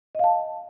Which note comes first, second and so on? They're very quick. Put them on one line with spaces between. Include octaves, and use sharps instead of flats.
D#5 F5 A5